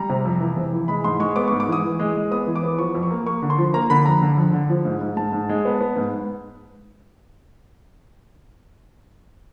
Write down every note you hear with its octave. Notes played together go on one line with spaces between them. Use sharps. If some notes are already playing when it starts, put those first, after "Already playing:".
Already playing: G3 A#5
C3
F2
E3
C3
E3
G#3 B5
G#2 C6
G#3 C#6
B3 D6
C#6
G#2
D6
E3 D#6
E3
G#3
G#3
B3 D#6
E3
D6
B3
F3 C#6
F2
C#6
A#3
A#3 C#6
D3
C6
F3
A#3 A#5
D3 B5
F2 A#5
D3
F2
D3
F3
G#2
G#2
G#2 A5
G#2
G#3
B3
B3
G#2